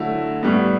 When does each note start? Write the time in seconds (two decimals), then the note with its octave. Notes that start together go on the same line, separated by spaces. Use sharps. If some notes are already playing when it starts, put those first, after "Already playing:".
Already playing: D3 F#3 A3 E4
0.43 A2 G3 B3